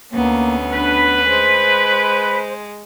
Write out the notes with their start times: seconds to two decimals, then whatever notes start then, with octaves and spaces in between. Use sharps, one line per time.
0.12 D2 A#3 B3 C#4
0.73 D4 B4
1.28 G#3 C5